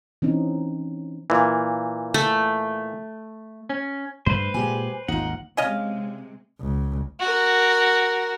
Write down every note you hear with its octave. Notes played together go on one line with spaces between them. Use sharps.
E3 C4 C#4 D#4
A#2 E3
A3
C#4
G2 A3 B4 C5
A#2 G#3 G4 G#5
G#1 D#2 D#4 F4 F#5
C3 G#3 C#4 D#5 F5
C#2
F#4 A#4